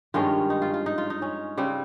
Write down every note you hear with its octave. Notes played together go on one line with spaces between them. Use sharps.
G2 D#3 G#3 C#4 F4
D#4
F4
F4
D#4
F4
D#4
C#4
C#3 G3 C4